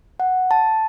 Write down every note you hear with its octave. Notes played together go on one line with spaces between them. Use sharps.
F#5
A5